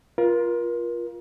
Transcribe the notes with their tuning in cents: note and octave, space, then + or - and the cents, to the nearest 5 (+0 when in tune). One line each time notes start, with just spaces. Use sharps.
F4 +0 A#4 +35